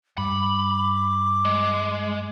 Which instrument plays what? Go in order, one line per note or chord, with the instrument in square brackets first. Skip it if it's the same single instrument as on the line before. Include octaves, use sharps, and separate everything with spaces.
[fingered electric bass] G2 [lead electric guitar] B5 [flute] D6
[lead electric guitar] G#3